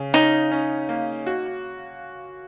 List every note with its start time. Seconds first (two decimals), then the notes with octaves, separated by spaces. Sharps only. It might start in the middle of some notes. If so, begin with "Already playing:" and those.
Already playing: C#3
0.14 C#4 D#4
0.52 C#4
0.89 A#3
1.26 F#4